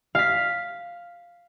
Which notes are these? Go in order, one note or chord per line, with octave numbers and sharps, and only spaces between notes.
F5 B6